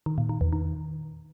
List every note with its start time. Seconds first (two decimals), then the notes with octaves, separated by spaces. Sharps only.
0.06 D#3
0.18 A#2
0.29 D#3
0.41 E2
0.53 D#3